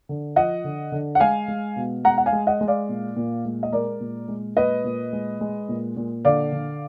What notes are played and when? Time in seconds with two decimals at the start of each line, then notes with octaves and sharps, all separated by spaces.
0.09 D3
0.36 F3 D#5 F#5
0.64 D3
0.92 D3
1.15 F#5
1.20 G#3 F5 G#5
1.48 G#3
1.76 B2
2.04 G#3 F#5 A#5
2.18 F#5
2.26 F5 G#5
2.33 G#3
2.47 D#5 F#5
2.61 G#3
2.68 D5 F5
2.89 A#2
3.16 A#2
3.45 G#3
3.63 D#5
3.72 G#3 A#4 D5
4.00 A#2
4.28 G#3
4.56 A#2 B4 D#5
4.84 A#2
5.13 G#3
5.41 G#3
5.69 A#2
5.97 A#2
6.25 D3 D5 F5
6.52 D3